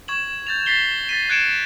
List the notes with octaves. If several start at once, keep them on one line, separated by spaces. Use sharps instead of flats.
C#6 G#6 E7 F#7
G6 A6 F7
A6 B6 C7 G7
A6 B6 D#7
F#6 G#6 C#7 D7 E7